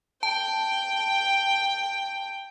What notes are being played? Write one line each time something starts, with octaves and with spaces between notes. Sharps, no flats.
G5 A5